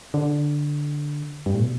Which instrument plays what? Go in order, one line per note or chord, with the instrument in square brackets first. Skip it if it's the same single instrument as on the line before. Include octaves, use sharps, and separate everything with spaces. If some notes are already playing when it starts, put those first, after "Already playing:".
[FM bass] D3
G2
A2
B2